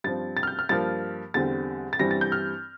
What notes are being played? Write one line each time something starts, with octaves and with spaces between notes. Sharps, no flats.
G2 F3 C4 A6
A6
F6
G6
F6
G2 F3 A#3 A6
E2 D3 G3 C4 A6
A6
G2 E3 G3 C4 A#6
A6
G6
F6